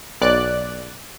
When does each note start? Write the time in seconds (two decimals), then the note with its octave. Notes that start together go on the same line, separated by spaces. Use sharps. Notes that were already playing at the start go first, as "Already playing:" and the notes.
0.21 B1 D5 F#6